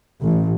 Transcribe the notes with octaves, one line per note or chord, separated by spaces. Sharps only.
A1